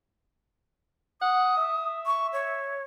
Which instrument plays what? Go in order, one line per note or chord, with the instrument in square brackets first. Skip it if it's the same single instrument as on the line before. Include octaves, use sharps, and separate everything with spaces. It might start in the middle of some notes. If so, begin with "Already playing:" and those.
[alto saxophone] F#5 [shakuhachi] D#6
[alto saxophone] E5
[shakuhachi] C#6
C#5